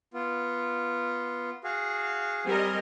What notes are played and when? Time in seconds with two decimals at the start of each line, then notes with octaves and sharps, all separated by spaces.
0.14 B3 F4
1.64 F#4 G#4 F5
2.45 G3 C4 A#4 D#5 G#5